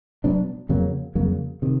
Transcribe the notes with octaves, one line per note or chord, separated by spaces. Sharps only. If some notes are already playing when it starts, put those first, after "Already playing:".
B2 F#3 B3 D4
F2 C#3 F#3 A#3
F2 C#3 F#3 A#3
C3 D#3